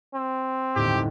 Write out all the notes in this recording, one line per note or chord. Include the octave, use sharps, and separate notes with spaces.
C4
G1 D#2 A2 G4